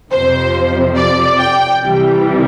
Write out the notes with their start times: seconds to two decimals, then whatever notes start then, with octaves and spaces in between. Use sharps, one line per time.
0.11 F2 C3 F3 C5
0.97 D5
1.39 G5
1.81 C2 C3 E3 G3